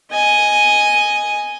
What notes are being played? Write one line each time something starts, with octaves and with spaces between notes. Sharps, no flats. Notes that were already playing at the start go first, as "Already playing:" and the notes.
D#5 G#5